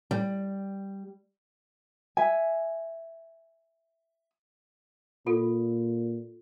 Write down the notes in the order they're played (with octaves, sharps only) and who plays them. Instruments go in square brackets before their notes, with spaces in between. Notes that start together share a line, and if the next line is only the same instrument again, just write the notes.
[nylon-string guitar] G3
[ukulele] E5 G#5
[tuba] A#2 [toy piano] F4 A4